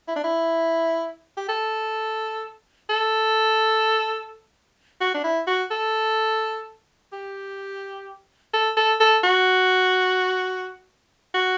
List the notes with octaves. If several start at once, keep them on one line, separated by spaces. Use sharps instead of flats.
E4
D4
E4
G4
A4
A4
F#4
D4
E4
F#4
A4
G4
A4
A4
A4
F#4
F#4